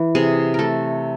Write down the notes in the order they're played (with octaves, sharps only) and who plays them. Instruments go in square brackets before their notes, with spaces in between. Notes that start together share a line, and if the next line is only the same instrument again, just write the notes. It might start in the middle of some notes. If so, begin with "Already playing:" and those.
Already playing: [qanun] E3
C3 G#4
A3 A4 A#4